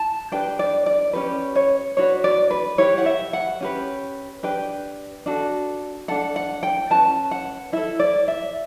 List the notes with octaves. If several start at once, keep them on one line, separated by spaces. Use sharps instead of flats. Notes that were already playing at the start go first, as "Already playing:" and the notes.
Already playing: A5
D4 G4 B4 G5
D5
D5
C#4 G4 B4
C#5
D4 F#4 B4 C#5
D5
B4
E4 G4 B4 C#5
F#5
E5
F#5
C#4 G4 B4
D4 G4 B4 G5
D4 F#4 A4
D4 A4 F#5
F#5
G5
C#4 F#4 B4 A5
F#5
E4 A4 E5
D5
E5